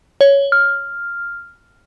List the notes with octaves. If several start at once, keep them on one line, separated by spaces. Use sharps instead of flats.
C#5
F6